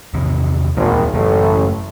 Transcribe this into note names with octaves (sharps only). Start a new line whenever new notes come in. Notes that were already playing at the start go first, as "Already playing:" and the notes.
E2 C3 D#3
G#1 D#2 A#2 E3
A1 F#2 C#3 A3